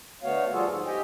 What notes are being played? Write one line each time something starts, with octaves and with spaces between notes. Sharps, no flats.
D3 A3 B3 F#4 C#5 F5
F3 G3 F4 F#4 G#4 A4
G#2
G4 D#5 G5 G#5